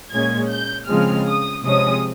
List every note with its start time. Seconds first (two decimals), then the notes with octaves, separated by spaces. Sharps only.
0.12 A#2 G#3 C#4 G#6
0.51 G6
0.88 C#3 F3 G#3 C4 F6
1.27 D#6
1.64 C3 F3 G#3 C#4 D#6